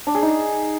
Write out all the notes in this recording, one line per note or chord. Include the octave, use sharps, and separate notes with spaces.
D4
G#4
D#4